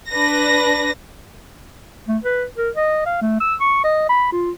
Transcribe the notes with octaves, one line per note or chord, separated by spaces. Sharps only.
D4 B4 A#6
A3
B4
A#4
D#5
F5
A3
E6
C#6
D#5
B5
F4